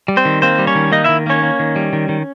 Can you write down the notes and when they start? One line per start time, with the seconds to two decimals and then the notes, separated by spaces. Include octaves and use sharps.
0.08 G3
0.17 C4 C5
0.25 D#3
0.42 A#3 C4 C5
0.59 G3
0.67 C#4 C#5
0.75 D#3
0.92 A#3 D#4 D#5
1.04 D#3 E4 E5
1.27 A#3 C#4 C#5
1.43 A#3
1.59 D#3
1.76 G3
1.93 D#3
2.09 D#3